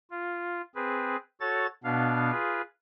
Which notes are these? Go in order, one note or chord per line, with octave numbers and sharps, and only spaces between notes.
F4
C4 G#4 B4
F#4 A4 C#5 A6
B2 B3 D4 F5
F4 G#4 B4